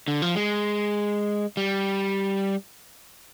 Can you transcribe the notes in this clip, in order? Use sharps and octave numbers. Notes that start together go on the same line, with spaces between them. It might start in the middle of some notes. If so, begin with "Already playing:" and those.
D3
F3
G#3
G3